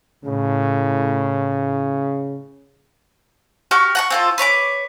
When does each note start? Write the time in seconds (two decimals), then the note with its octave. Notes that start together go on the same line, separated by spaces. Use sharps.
0.24 A2 C#3
3.71 F#4 G4 C#6 F6
3.95 F#5 A#5 C#6
4.10 C4 F4 A4
4.38 B4 C#5 A#5 D6